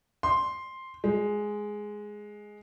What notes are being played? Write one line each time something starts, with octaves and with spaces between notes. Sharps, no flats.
C6
G#3